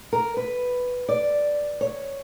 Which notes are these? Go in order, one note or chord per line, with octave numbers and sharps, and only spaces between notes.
A#4
B4
D5
C#5